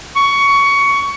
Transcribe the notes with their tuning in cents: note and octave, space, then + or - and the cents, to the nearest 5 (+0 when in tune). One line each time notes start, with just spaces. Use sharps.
C#6 +15